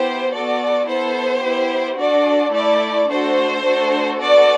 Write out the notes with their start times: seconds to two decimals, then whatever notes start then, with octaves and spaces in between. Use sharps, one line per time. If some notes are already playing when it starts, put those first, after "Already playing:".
Already playing: B3 E4 G4 C5
0.33 B3 F#4 A4 D5
0.89 B3 E4 A4 C5
1.44 B3 E4 G4
1.98 D4 F#4 A4 D5
2.54 A3 E4 A4 D5
3.10 A3 D4 F#4 A4 C5
3.65 A3 D4 F#4 A4
4.20 B3 F#4 A4 D5